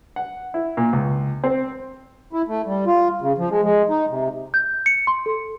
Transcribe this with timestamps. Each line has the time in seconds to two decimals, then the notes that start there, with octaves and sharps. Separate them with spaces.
0.16 F#5
0.54 E4
0.77 A#2
0.93 C#2
1.44 C4
2.33 E4
2.48 A3
2.66 G3
2.87 F4
3.21 C#3
3.38 F3
3.50 G#3
3.62 G#3
3.90 D#4
4.10 C3
4.54 G6
4.86 C#7
5.07 C6
5.26 A4